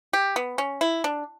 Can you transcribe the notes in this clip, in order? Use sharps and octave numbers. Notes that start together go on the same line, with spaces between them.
G4
B3
C#4
E4
D4